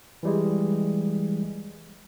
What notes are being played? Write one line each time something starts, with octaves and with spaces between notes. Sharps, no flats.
E3 G3 G#3